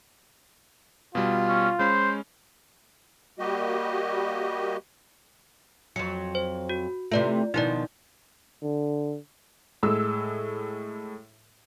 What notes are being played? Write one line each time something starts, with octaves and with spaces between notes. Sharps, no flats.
B2 G3 F4
C#4
G#3 C#4 C5 B5
G3 A#3 F#4 G4 D#5
F2 F#3 C#7
C5
F#4
C3 E3 A3 F4 D5
B2 D#3 F3 D#4 E4 D5
D3
A2 G#3 E6